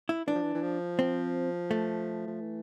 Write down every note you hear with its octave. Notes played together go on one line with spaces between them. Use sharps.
E4
E3 D4
F3
E3
E3
F3
C4
A3
F3
E3